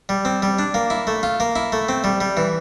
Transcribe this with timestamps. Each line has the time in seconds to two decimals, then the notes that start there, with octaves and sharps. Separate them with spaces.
0.09 G3
0.25 C4
0.42 G3
0.59 D4
0.74 A#3
0.90 E4
1.07 A3
1.23 F4
1.40 A#3
1.56 E4
1.72 A3
1.89 C4
2.04 G3
2.21 G3
2.37 E3